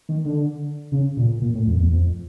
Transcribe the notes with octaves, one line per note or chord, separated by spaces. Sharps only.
D#3
D3
C#3
A#2
A#2
A2
F2
E2
F2